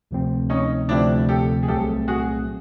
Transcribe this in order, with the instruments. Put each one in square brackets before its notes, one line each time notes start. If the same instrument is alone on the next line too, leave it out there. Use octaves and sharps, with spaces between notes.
[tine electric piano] D2 C3 F3 A3 C4
[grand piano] C#4 D#4
[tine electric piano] D2 C3 F3 A3 C4 [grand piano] D4 E4
[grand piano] G4 A4
G#4
[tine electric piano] C2 A#2 F#3 A3 C4 [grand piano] G4 A4
[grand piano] F#4 G#4